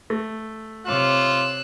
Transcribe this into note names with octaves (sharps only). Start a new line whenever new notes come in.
A3
C3 F4 C#5 D6 E6 F#6